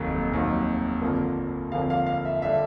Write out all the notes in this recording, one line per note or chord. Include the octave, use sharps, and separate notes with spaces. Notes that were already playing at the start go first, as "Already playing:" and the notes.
Already playing: F1 D#2 D#3 F#3
F1 D#2 D#3 F#3
G1 F2 D3 F3 A#3
G1 F2 D3 F3 A#3 F5
F5
F5
E5
D3 G3 E5